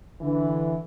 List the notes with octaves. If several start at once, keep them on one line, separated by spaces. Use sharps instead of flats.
D3 E3